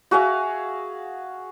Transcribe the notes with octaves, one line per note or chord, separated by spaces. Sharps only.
F#4 G#4 E5 F5